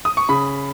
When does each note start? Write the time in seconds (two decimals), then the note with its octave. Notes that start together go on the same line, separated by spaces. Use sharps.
0.05 D#6
0.17 C#6
0.29 C#3 B5